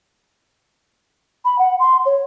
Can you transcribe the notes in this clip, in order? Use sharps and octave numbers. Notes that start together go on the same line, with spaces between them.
B5
F#5
C6
C#5